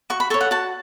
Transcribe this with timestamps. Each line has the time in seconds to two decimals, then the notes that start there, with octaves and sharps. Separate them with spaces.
0.10 F#4 C#6
0.20 B5
0.30 A4 C#6
0.34 C#5
0.41 F#5
0.51 F#4 A5